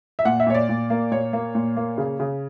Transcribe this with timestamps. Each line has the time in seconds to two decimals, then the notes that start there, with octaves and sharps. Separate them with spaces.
0.19 E5
0.25 A#2 F#5
0.40 E5
0.47 A#2 C#5
0.54 D5
0.69 A#2
0.90 A#3
1.12 A#2 C#5
1.33 A#3
1.55 A#2
1.77 A#3
1.98 C#3
2.20 C#3